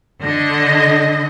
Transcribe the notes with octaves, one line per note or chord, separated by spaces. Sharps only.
D3 D#5